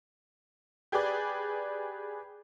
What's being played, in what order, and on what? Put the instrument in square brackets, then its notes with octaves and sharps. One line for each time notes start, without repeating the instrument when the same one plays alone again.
[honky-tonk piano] G4 G#4 B4 D5